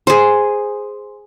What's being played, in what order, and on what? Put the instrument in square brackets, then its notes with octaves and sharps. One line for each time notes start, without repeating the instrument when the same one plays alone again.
[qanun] G#4 C5